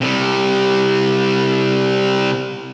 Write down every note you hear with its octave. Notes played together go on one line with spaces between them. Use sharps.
C3 G3